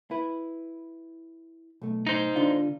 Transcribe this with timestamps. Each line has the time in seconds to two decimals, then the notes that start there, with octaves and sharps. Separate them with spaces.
0.11 E4 B4
1.82 B1 A3
2.07 D#4 C5
2.36 D3 D4 F4